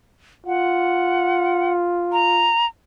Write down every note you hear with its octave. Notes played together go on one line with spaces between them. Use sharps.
F4 F#5
A#5